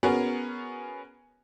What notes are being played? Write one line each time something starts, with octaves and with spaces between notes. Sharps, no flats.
B3 C#4 F#4 G#4 A#4